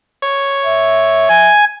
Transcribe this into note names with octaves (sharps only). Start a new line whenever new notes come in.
C#5
E5
G#5